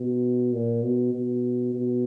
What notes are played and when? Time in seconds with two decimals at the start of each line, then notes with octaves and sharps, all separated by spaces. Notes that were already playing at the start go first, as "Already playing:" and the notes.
Already playing: B2
0.53 A#2
0.83 B2
1.13 B2
1.74 B2